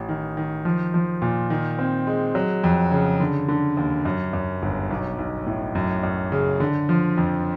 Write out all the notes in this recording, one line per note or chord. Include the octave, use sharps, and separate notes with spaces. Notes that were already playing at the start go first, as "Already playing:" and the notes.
Already playing: A1
D#3
D#3
F3
F3
A#2
D#3
C4
G#3
F#3
F2
C#3
D3
D3
D#2
F#2
F#2
G1
B1
B1
A2
F#2
F#2
C#3
D3
F3
F2